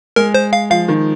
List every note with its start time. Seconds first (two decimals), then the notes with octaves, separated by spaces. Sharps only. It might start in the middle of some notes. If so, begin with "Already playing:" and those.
0.16 G#3 A#4
0.34 C5
0.53 F5
0.70 F3 F5
0.88 D#3